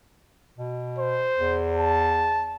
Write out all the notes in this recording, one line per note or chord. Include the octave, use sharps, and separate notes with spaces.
B2
C5
E2
A5